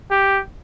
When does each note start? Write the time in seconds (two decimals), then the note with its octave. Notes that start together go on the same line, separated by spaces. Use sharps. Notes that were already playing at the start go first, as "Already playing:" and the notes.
0.11 G4